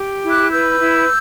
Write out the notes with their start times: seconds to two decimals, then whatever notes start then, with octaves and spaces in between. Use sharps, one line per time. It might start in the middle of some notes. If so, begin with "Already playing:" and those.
Already playing: G4
0.22 E4
0.29 D6 F#6
0.50 B4 E6 G6
0.79 E4